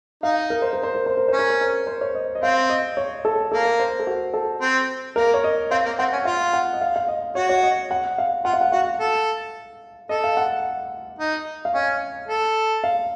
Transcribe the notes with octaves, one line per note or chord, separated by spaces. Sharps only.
D#4 F5
A#4
C5
A#4
C5
A#4
C5
A#4
C#4 C5
A#4
C5
A#4
C5
C#5
D#5
D#5
C4 F5
D#5
C#5
A4
A#3 A4
A#4
C5
A4
F#4
A4
C4
A#3 A#4
C#5
D#5
C4 F5
A#3
C4 F#5
C#4
F4 F5
F#5
D#5
F5
F5
D#5
F#4 C#5
C#5
D#5
F#5
F5
F4 F#5
F5
F#5
F#4 F5
A4
A4 D#5
F5
F#5
D#4
F5
C#4 D#5
A4
F5